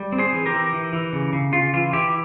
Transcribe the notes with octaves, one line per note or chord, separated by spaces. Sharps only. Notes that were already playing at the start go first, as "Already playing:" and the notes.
Already playing: G3
C4
G#4 C5
E3
G4 A#4
E3
E3
E3
C#3
C#3
C#3 F4
E3 F4
E3 E4 G4